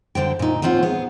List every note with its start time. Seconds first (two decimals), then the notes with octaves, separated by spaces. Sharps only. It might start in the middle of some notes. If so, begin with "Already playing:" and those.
0.15 F#2 D3 C5 G5
0.39 A#2 D#4
0.62 D#2 A2 C4 F4 F#5
0.83 B3 G#4